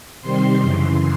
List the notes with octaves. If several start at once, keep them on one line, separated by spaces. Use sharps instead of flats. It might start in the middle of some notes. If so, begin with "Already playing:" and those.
C3 D#3 G3 C4 C6
F#2 C#3 E3